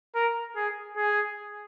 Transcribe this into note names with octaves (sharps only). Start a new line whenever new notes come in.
A#4
G#4
G#4